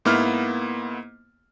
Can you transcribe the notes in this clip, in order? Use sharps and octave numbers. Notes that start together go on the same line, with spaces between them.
G#2 A#3 B3 E4 F6